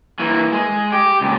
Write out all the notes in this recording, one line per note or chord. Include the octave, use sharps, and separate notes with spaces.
E3 A#3
G#3
G4
C#2 A#2